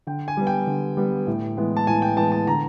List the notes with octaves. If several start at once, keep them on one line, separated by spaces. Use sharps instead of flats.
D3 G5
G#5
G3 B3
G5
D3
G3 B3
A2
E3 G#3 B3
A5
A2 G#5
G5
E3 G#3 B3 A5
A5
D3 A#5